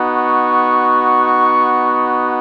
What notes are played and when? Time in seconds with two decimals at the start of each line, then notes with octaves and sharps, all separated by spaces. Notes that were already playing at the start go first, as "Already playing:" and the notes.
Already playing: B3 D#4 F#4
0.15 C#6